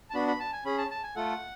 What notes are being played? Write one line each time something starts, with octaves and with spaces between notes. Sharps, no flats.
A5
B3 D4 F#4 B5
B5
A5
G#5
C#4 G#4 B5
A5
A5
G#5
A3 F4 A4 F#5